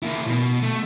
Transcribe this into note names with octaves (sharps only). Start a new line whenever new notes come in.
A#3 E4
B2
A3